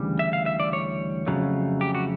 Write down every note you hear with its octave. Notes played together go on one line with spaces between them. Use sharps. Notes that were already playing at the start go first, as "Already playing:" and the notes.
Already playing: D2 C#3 E3 G3
E5
F5
E5
D5
C#5
F2 C#3 F#3 A3
G4
F#4